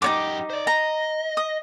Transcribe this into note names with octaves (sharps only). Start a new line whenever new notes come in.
F#2 D#4 G4 C#5 D6
C5 D5
D#5 A#5
D#6